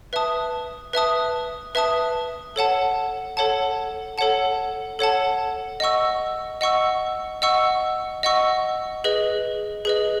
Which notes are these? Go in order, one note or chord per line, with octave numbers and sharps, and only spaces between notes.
B4 E5 A5 D#6
B4 E5 A5 D#6
B4 E5 A5 D#6
A4 C#5 F#5 A5
A4 C#5 F#5 A5
A4 C#5 F#5 A5
A4 C#5 F#5 A5
D#5 F#5 C#6 E6
D#5 F#5 C#6 E6
D#5 F#5 C#6 E6
D#5 F#5 C#6 E6
G#4 B4 D#5
G#4 B4 D#5